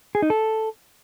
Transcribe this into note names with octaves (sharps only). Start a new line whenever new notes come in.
G#4
D#4
A4